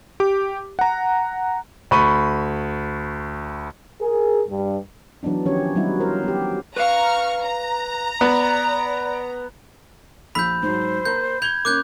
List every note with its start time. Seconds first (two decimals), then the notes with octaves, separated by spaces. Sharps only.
0.20 G4 D6
0.79 F#5 A#5
1.91 D2 B5 C#6 D#7
4.01 G#4 A#4
4.48 G2
5.23 E3 F#3 B3 D4 D#4
5.45 D#3 F3 C#4 G4 C#5
5.75 F#3 G3 B3 D#4 E4 F#4
6.00 A#4 C5
6.23 B3 G4
6.76 B4 F5 A#5 C#6 F6
7.42 A#5
8.21 B3 D5
10.35 A#1 B5 E6 G6 B6
10.63 G#2 F#3 C5
11.05 A#3 A#5 B5 G6
11.42 G6 G#6 F7 G7
11.65 A#3 C#4 D6 F#6 G6